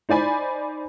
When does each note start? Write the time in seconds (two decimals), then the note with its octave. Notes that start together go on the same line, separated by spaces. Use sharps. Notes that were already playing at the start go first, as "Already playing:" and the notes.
0.09 D#4 C5 D5 G#5 B5